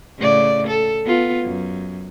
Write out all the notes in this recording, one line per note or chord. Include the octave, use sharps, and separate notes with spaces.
A2 C#3 D5
A4
B3 F4
F#2